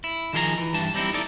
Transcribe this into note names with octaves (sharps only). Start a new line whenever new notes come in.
E4
D#3 F3 G#4 D5 A#5
E3
G2 E3 A5
G3 C4 D#4 E4
D#4 E4 A4 D5